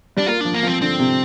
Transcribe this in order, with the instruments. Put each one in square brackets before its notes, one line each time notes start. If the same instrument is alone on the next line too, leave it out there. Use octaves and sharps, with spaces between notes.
[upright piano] G3 [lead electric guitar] D4
[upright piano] A#3 [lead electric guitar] F4
[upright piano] F3 [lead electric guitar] D4
[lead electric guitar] A#3
[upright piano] F3
[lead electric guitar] C4
[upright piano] D3 [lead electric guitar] C4
[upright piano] C3